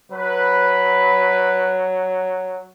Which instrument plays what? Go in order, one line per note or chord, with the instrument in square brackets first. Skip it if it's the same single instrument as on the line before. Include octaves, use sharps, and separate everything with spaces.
[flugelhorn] F#3 [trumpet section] B4